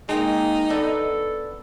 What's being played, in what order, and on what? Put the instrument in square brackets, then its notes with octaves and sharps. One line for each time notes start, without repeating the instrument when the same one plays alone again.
[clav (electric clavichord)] G#3 [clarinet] A#3 [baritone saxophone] D#4 [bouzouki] A#4 G5 A#5
[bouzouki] B3 [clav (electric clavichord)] D4 [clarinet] A4